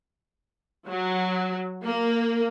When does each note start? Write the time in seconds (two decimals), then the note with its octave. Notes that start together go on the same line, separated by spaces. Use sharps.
0.88 F#3
1.85 A#3